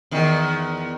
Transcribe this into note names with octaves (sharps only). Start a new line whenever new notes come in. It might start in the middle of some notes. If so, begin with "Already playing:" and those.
E2 D#3